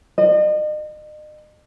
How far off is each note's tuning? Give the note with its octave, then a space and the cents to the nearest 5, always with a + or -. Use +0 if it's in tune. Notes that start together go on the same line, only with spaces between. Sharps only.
D#5 -40